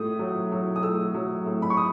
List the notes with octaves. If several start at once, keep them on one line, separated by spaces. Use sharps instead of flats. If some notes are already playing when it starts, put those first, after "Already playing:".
Already playing: A2 A3 D#6
F#3
F#3
D#6
A3 E6
F#3
A2
B5
C#6
D#6